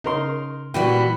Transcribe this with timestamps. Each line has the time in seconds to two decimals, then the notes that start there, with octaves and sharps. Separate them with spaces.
0.04 C#3 D#4 A#4 C6
0.74 A#2 E3 G3 F#4 G5 B5